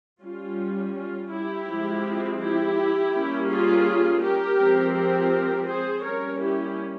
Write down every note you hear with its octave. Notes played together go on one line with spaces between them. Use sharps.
G3 C#4 F4
F4
E4 G4
F3 G#3 C4
E4 G4
G3 A#3 C#4
F4 G#4
G4 A#4
F3 G#3 C4
G4 A#4
G#4 C5
G3 A#3 C#4 A#4 C#5
E4 G4